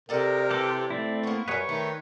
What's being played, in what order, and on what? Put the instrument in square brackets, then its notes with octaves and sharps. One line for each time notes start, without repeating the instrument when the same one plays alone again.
[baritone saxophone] C3 [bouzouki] A4 D5 D#5 [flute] A#4
[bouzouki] E3 [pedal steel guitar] G4 A4 D5
[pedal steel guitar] A3 C4 E4 [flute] D5
[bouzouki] A#3 B3 [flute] C#6
[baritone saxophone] F#2 [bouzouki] G3 G#3 [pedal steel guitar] B4 C#5
[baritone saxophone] D#3 [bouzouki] A3